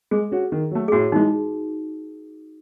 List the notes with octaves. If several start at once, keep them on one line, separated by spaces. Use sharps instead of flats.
G#3 G#4
C#4 F#4
D#3
F#3 A3
G#4
A2 F#4
E3 G#3 D#4